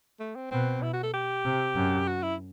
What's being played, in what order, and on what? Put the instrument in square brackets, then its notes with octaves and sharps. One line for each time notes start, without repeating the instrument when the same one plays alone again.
[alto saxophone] A3
C4
[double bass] B2 [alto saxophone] C4
[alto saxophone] E4
F#4
A4
G4
[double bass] C3
F#2
[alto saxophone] F#4
E4